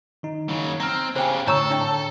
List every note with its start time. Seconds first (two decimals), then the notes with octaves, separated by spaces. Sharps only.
0.23 D#3 D#4
0.49 C#3 F#3
0.80 C4 A#5 F6
1.16 C#3 G4 C5 G5 G#5
1.47 A2 D3 A4 C#5 A#5 C#6 E6
1.70 D4 E5 G5